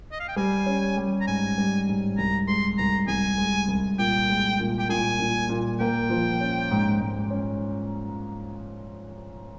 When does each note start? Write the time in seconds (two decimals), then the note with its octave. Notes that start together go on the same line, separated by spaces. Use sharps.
0.12 D#5
0.20 F5
0.28 G5
0.36 G3 G#5
0.66 C#4
0.97 G3
1.21 A#5
1.27 G#2 G#5
1.58 G3
1.88 G#2
2.18 C2 A#5
2.48 G#3 C6
2.78 C2 A#5
3.08 C2 G#5
3.38 G#3
3.68 C2
3.99 A#2 G5
4.29 G#3
4.60 A#2
4.79 G5
4.89 A#2 G#5
5.20 A#2
5.49 A#2
5.80 A#3 G5
6.10 F3
6.40 C#4
6.71 G#2
7.00 G#2
7.30 C#4